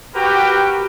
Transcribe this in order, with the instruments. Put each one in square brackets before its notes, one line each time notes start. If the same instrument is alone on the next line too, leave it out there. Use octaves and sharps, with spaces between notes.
[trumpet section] F#4 G4 A#4 B4 G5